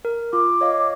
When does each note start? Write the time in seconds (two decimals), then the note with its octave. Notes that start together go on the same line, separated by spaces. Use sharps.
0.05 A#4
0.33 F4 D6
0.61 C#5 D#5 F5